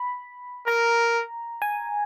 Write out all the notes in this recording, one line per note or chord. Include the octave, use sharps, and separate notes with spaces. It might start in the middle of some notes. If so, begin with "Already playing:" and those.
Already playing: B5
A#4 A#5
G#5